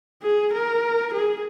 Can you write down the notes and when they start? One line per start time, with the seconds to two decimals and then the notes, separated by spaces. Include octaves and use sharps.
0.22 G#4
0.53 A#4
1.13 G#4